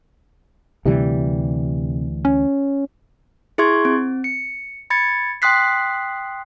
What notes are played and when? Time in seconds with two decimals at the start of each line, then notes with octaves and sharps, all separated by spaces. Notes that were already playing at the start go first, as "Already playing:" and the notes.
0.86 D2 C3 E3 G3
2.25 C#4
3.58 E4 G#4 E5 C6 C#6 G#6
3.85 C4
4.24 C#7
4.90 B5 G#6 A6 C#7
5.42 G5 C6 D#6 F#6 B6 C7